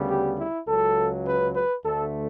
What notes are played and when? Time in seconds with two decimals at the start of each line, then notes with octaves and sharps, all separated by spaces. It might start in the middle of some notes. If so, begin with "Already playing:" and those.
Already playing: D2 C#3 G3 B3
0.10 G4
0.39 E4
0.68 C#2 C#3 F#3 A4
1.27 B4
1.56 B4
1.85 D2 D3 A3 A4